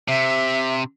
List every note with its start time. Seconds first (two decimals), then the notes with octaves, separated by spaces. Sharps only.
0.08 C3 E5